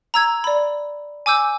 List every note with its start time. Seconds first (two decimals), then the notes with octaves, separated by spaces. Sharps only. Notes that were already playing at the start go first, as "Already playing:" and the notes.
0.14 A#5 E6 G#6
0.44 D5 B5
1.26 G#5 D6 E6 G6